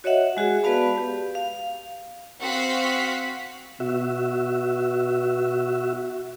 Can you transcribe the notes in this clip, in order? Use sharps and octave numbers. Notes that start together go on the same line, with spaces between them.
F#4 C#5 D#5 E5 F#5
G#3 F#4 G#4
B3 B4 D5 F5 A5 B5
G4
F5
C4 F#4 F5 F#5 B6
B2 F#4 E5